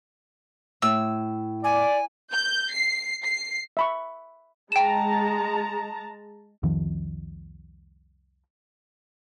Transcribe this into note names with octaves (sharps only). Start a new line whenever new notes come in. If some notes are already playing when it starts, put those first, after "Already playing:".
A2 E6
D5 G#5
G6
C7
C7
E5 B5 C#6
G#3 G5 A5 A#5 E7
C2 F2 D#3 F3